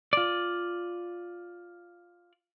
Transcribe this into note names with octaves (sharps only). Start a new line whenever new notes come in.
F4 D5